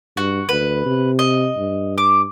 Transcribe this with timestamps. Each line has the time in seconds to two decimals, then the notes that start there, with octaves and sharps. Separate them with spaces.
0.17 G2 F#4
0.49 D2 B4
0.86 C3
1.19 D#5
1.58 G2
1.98 D6